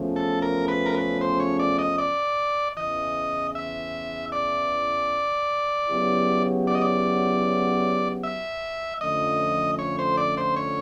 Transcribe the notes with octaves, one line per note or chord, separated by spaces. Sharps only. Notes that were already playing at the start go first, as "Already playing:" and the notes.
Already playing: E2 C#3 F3 A3 C#4
A4
A#4
B4
A#4
B4
C5
C#5
D5
D#5
D5
E2 C#3 E3 D#5
E5
D5
C#3 F#3 B3 E4 G4
D5
D#5
D5
E5
F2 D3 F3 A3 C#4 D#5
C#5
C5
D5
C5
C#5